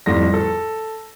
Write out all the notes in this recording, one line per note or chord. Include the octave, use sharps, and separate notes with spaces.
F2 A2 G3 A#6
A4